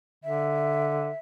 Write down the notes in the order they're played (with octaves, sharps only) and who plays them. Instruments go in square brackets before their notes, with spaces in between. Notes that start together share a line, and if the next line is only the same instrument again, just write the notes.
[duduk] D3 [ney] E5